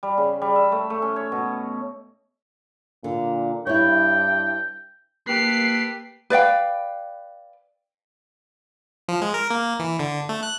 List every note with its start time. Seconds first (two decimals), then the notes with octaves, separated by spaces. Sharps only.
0.03 G3
0.18 C#3
0.42 G3
0.56 E5
0.72 A3
0.90 A3
1.02 C#4
1.16 C#5
1.32 B2
3.04 A#2 D3
3.67 G2 E4 C#5 G5
5.28 A3 A#3 G4 B4 C7
6.30 B4 D5 F5 G5
9.09 F3
9.22 G#3
9.34 A#4
9.50 A#3
9.79 E3
9.99 D3
10.29 A3
10.43 F#6